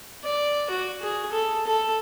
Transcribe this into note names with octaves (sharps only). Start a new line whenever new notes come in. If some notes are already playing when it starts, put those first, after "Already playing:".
D5
F#4
G#4
A4
A4